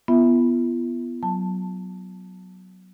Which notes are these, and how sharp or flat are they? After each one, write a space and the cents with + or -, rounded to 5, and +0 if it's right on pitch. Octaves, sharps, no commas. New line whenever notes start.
B3 +0 F4 -40 E5 +0
F#3 +0 A5 +0